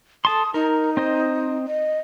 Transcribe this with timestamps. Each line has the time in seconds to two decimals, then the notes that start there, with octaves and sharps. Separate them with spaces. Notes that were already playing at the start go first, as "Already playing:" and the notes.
0.25 A4 A5 C6 D#6
0.54 D#4 A#4
0.97 C4 C5 D#5
1.67 D#5